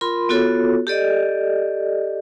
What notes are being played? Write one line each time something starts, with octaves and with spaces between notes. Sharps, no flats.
F4 A#4 B5 C6
B3 F4 F#4 A4 C#5
G4 A4 D5 D#5